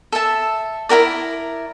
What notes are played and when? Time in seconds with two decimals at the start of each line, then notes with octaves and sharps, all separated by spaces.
0.12 A4 E5 A5
0.89 E4 G4 A#4 D5